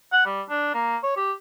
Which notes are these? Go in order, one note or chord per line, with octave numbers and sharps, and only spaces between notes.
F#5
G3
D4
A#3
C#5
G4